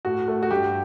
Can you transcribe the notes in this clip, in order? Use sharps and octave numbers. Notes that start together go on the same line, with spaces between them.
A2 F#4
A3
F#4
G2 G4